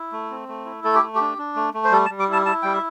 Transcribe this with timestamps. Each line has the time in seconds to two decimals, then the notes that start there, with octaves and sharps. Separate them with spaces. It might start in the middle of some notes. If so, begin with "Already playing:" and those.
Already playing: E4
0.12 A3
0.30 C4
0.48 A3
0.66 E4
0.84 A3 A4
0.95 G4
1.02 A3
1.15 G4
1.21 D4
1.38 D4
1.56 A3
1.74 A3
1.85 C5
1.92 G3 A4
2.05 A5
2.10 G3
2.19 D6
2.28 E4 A5
2.46 E4 A5
2.63 G3 G5
2.74 E5